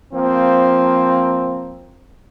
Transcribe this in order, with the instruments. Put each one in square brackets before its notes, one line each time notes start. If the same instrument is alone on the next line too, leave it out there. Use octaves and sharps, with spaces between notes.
[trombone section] F3 A#3 C4